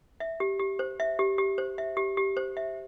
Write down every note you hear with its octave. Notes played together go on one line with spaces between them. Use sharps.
E5
G4
G4
C5
E5
G4
G4
C5
E5
G4
G4
C5
E5